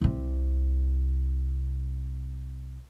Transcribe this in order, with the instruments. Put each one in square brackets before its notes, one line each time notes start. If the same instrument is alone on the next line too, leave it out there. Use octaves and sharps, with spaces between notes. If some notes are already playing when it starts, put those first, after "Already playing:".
[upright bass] C2 C3